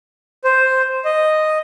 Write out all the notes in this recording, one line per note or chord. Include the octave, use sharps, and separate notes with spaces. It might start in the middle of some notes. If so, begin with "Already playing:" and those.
C5
D#5